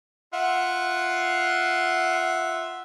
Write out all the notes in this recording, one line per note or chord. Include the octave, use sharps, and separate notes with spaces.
F4 E5 F#5